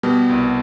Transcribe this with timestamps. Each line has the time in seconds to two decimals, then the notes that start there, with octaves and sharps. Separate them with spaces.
0.03 B2 G3 B3
0.29 C2